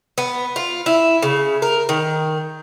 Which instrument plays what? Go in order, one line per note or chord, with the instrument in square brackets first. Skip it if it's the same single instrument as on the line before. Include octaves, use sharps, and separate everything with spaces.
[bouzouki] B3
F4
E4
C#3
A#4
D#3